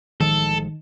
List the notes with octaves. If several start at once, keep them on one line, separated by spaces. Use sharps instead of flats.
A1 D#3 F3 G#3 A4